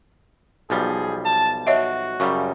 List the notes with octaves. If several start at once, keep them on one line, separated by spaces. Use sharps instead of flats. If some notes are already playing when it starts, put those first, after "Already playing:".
B1 F3 G3 G#4
A5
F#4 C#5 D#5 E5
F#2 C#3 G3 F5 C#6